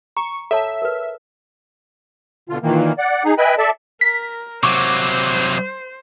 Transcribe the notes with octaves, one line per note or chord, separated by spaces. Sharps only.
A#5 C#6
A4 C#5 E5 A5
A#4 B4
B2 D3 F4
A#2 D#3 E3 A#3
D5 F#5
D#4 G#4
B4 D#5 E5 G5 G#5 B5
A4 D5 E5 A5
A#4 B6
C3 F#3 C5 C#6 D6